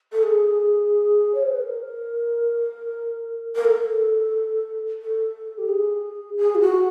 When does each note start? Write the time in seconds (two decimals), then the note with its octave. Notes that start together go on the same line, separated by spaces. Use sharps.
0.12 A4
0.23 G#4
1.35 C#5
1.43 C5
1.52 B4
1.59 A#4
3.56 A#4
3.65 A4
5.02 A4
5.58 G4
5.69 G#4
6.37 G#4
6.55 F4
6.61 F#4